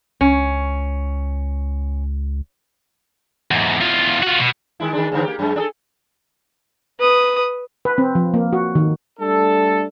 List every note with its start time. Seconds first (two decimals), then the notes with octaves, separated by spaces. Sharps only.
0.21 C#2 C#4
3.51 E2 G#2
3.81 E2 F4
4.23 F4 F#4
4.39 B2
4.80 D#3 G#3 E4
4.93 D#3 G#3 D4
5.12 D#2 G#2 D3
5.24 A#3 G4
5.39 F#2 G#3
5.56 D4 G#4 A4
7.00 B4 D#6
7.85 B4
7.98 C4
8.15 F3
8.34 A#3
8.53 F#4
8.75 D#3
9.20 G3 A3 D4 A4